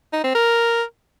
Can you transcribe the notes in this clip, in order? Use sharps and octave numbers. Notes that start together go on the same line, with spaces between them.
D#4
C4
A#4